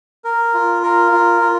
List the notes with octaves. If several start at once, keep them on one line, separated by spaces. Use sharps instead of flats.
A#4
F4
A#4
F4
F4